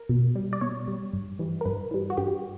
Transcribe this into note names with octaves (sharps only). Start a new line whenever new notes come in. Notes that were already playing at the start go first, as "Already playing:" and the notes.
Already playing: A#4
B2
G3
D5
B2 C#5
G3
G2
E3 G3
A#4
G2 B4
E3 G3
F#4
G2 G4